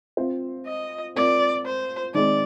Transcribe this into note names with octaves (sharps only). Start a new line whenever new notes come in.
C4 F4 C5
D#5
C4 F4 A#4 D5
C5
D#3 G#3 C4 D5